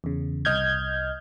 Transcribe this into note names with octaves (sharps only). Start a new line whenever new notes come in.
E2 C#3
C2 D#5 F6 G6 G#6